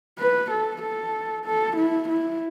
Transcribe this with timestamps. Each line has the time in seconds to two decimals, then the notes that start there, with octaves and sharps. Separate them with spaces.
0.18 B4
0.50 A4
0.82 A4
1.45 A4
1.76 E4
2.09 E4